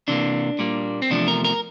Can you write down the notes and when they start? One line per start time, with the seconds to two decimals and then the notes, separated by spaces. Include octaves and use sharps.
0.08 C3 E3 A#3 D4
0.59 A#2 G3 A#3
1.02 C4
1.10 E2 C3 F3 A3 D4
1.28 A#4
1.44 A#4